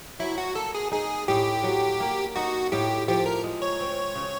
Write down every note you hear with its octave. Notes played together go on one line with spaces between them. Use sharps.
F#3 E4
F#4
A#3 A4
G#4
D#4 G#4
A2 G4
F#3
A#3
D#4 F#4
A2 G4
F3 G4
A#4
G#3
C#5
C4
C#3